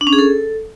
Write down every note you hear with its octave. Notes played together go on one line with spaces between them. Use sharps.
D4
C#4
G#4
A4